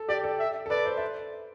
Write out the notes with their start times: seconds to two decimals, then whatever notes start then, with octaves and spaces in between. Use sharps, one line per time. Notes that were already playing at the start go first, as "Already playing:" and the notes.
Already playing: A4
0.09 G4 D5
0.24 A4
0.39 E5
0.66 A4
0.70 B4 D5
0.86 C5
0.97 E5